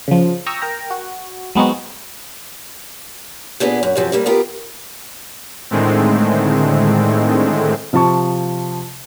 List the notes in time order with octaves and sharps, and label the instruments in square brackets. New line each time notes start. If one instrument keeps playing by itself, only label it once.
[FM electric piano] C#3 F3
G5 A#5 C#6 D#6 E6
A#4 G5 A#5
F#4
F#3 G#3 B3 C4 D#4 F#4
[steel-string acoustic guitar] A#2 B3 D4 F4 G#4
F#2
F#2 C3 F3
C3 G3 A#3
B3 F4 G4 A#4
[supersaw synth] A2 D3 D#3 G#3 A3 C4
[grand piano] C3 F3 F4 A5 C#6